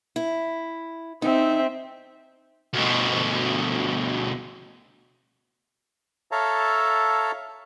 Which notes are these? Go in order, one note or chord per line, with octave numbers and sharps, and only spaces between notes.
E4
C4 D#4 E5
D2 B2
A4 C#5 E5 F5 A5 A#5